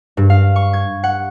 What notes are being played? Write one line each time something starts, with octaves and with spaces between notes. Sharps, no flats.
G2
F5
C#6
G#6
F#5